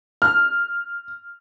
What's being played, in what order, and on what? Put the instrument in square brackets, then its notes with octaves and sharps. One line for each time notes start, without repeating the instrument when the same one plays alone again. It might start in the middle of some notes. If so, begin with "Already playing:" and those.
[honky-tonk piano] F6